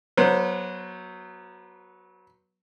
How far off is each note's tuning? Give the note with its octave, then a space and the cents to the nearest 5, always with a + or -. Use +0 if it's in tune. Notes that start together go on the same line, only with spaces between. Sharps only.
F#3 +0 B3 -30 C5 +0